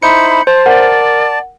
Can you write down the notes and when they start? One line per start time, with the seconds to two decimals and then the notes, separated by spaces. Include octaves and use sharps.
0.03 D#4 E4 C5 B5 G6 C#7
0.47 C5 A5 C6
0.66 A#4 D5 F#5